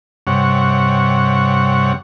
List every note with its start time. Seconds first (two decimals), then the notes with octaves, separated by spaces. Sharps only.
0.27 G2 C3 C#5 F#5